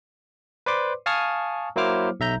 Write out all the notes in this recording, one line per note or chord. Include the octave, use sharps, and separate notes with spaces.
B4 C5 D5 C6 D6
F5 G#5 A5 C#6 D#6 F6
F#3 A#3 E4 C5 D6 F6
B1 E5 A#5 G6